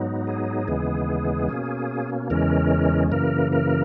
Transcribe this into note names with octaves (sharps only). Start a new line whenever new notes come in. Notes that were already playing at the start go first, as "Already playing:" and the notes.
Already playing: G#2 F#3 B3 D#4
G#4
D#2 C#3 E3 G#3 B3
B2 A#3 C#4
E2 C#3 E3 G#3 C#4 A#4
F#2 C#3 E3 A#3 A#4
A#4